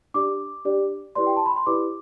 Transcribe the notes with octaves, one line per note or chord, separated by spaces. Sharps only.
D4 G4 D5 D6
D4 G4 D5
E4 G4 B4 D5 C6
G5
A5
B5
C6
E4 G4 B4 D5 D6